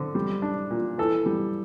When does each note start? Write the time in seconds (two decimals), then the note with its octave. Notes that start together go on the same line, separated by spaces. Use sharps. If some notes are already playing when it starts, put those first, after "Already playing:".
Already playing: D3 C4
0.15 G3
0.42 D4
0.71 A#2
0.98 E3 A4
1.26 G3